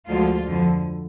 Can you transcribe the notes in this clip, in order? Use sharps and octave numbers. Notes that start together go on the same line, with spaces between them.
D2 D3 F3 G#3 F4
F2 D3 F3